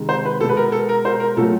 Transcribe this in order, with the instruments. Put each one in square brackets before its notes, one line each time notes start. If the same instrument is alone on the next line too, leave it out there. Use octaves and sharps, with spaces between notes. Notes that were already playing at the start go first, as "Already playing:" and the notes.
Already playing: [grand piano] C3 D#3 G#3
C5
B4
B2 A4
G#3 B4
A#4
A4
A#4
C5
A#4
A#2 F#3 A3 A4